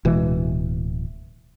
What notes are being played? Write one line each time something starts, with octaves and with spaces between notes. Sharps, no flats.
D1 B2 E3 G#3